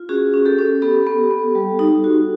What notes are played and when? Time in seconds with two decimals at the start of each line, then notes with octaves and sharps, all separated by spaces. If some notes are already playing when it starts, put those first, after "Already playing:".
Already playing: F4
0.09 C#4 F#4 G#4
0.34 C#4
0.45 G4 A4
0.59 C#4
0.82 B3 G4 A4
1.07 B3
1.31 B3
1.55 G3
1.79 D#4
2.04 F#4